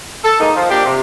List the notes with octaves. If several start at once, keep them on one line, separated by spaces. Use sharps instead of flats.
A4
G#3 A#3 D#4
F3
A#2 D4 G4
C3